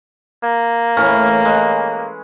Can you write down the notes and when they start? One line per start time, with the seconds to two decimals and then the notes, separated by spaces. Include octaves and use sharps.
0.44 A#3
0.97 A2 E3 C#4
1.45 G#3